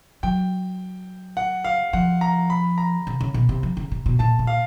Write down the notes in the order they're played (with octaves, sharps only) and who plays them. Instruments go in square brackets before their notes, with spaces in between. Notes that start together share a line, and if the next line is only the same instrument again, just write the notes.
[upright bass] F#3 [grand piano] G5
[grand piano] F#5
F5
[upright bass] F3 [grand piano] F#5
[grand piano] A#5
B5
A#5
[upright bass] C3
C#3
B2
C3
F3
C#3
C3
B2
[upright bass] A#2 [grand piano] A5
[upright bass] A#2
[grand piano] F5